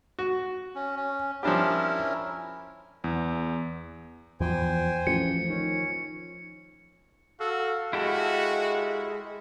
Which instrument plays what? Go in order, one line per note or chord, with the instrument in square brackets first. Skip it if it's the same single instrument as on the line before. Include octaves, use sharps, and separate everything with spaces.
[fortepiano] F#4
[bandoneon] C#4
C#4
[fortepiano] F3 D4 G4 [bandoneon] C#4 E4 A#4
[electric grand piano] E2
[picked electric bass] E2 F3 [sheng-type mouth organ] C5 G5 G#5
[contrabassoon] A1 [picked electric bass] F3 [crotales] C#7
[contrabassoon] D#3 [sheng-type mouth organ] C#4
[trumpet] F#4 [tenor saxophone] A4 [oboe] F5
[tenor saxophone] G#3 [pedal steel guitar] E4 G4 A4 [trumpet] F#4